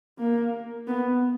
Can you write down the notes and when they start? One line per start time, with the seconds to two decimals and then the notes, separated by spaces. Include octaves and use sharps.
0.19 A#3
0.87 B3